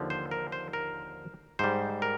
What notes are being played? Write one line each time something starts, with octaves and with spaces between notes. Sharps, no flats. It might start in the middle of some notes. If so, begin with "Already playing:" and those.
Already playing: D#2 D3 F3
C5
A#4
C5
A#4
G#2 G3 C5
A#4